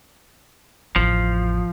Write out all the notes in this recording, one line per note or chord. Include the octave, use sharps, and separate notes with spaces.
A1 F2 F3